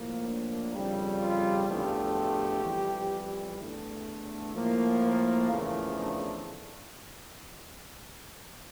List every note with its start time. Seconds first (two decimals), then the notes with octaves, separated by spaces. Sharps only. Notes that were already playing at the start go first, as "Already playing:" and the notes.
Already playing: A2 F3 A#3
0.25 D4
0.73 F2 C#3 G3
1.20 F4
1.68 E2 D3 F3 A3 G4
2.64 F2 E3 G3
3.59 E2 D3 A3
4.55 A2 F3 A#3
5.03 A#4
5.51 E2 C#3 F3 A3 A#4
5.99 D4